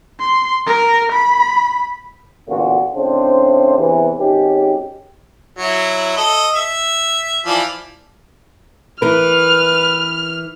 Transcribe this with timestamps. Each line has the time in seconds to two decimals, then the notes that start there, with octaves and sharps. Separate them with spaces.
0.20 C6
0.67 A#4
1.13 B5
2.48 A1 E2 A#2 D3 F4 F#4
2.96 A2 C#3 C4 D4 C5
3.78 E2 C3 E3
4.18 G#1 D#3 C#4 G4
5.59 F#3 E4
6.17 A4 D#5
6.55 E5
7.46 E3 F3 D5
9.02 E3 A#4 B4 F6